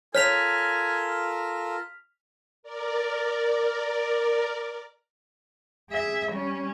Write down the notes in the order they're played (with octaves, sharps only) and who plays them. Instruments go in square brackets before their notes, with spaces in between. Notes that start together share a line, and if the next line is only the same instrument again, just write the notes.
[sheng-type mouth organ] F4 A4 A#4 [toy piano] C#5 [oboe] G#5 [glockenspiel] F6 B6 F7
[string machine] A#4 D5
[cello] G#4 E5
G3 C#4